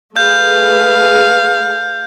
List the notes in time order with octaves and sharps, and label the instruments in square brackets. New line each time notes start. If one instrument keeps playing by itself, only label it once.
[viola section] A3 G#4 B4 [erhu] F5 [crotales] G6